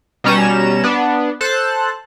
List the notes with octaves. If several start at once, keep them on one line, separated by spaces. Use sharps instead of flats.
B2 G3 C#4 A#5 E7
B3 D4
A4 C5 A5 F#6